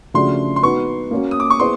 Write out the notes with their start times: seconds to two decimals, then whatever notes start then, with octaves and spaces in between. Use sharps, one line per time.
0.14 C#3 F3 A3 D4 F#4 C6
0.56 C6
0.63 B3 D#4 F#4 C#6
1.11 A#3 C#4 F#4
1.31 D#6
1.40 D6
1.50 C#6
1.60 B3 E4 G#4 C5 C6